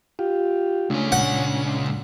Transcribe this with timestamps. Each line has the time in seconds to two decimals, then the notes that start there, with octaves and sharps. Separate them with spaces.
0.19 F4 G4
0.90 C#2 A3 C#4 D4
1.12 A#2 F#5